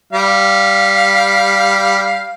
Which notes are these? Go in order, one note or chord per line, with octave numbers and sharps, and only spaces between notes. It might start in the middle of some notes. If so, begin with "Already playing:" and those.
G3 F5